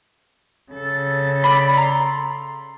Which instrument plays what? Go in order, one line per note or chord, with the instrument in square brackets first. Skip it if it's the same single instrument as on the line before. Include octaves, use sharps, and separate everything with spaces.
[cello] C#3 A4
[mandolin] D5 B5
A#5 C6